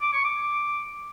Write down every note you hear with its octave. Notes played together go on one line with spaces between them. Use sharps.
D6
C#6
D6